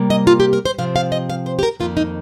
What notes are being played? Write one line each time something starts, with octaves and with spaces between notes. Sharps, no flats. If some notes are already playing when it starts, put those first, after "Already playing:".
Already playing: C3 G3 A#3
D#5
F4
G4
A#4
C5
C3 F3 C4 F5
F5
D#5
F5
C5
G4
A#4
F2 D#3 A#3 F4
D#4